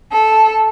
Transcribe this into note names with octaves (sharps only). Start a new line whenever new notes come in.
A4